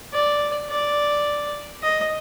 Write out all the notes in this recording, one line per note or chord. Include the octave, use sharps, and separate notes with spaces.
D5
D5
D#5